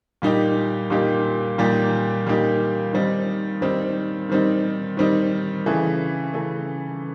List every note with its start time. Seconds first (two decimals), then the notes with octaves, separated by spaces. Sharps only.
0.22 A#2 G3 A#3 D#4 G4
0.90 A#2 G3 A#3 D#4 G4
1.58 A#2 G3 A#3 D#4 G4
2.26 A#2 G3 A#3 D#4 G4
2.93 D#3 G3 C4 D#4
3.61 D#3 G3 C4 D#4
4.30 D#3 G3 C4 D#4
4.97 D#3 G3 C4 D#4
5.66 C#3 E3 A3
6.34 C#3 E3 A3